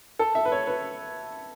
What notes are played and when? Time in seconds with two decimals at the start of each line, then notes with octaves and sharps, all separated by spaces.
0.19 A4
0.35 E5
0.45 B4
0.52 C#5
0.67 B4